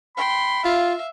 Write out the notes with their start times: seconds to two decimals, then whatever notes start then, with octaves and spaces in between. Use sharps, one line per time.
0.17 G5 B5 C6
0.65 F4 E5 F5